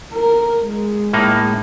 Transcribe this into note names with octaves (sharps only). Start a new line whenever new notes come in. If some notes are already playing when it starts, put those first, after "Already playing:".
A#4
G#3
A2 A#3 D#4